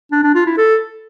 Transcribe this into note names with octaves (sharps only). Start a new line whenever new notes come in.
D4
D4
F4
E4
A4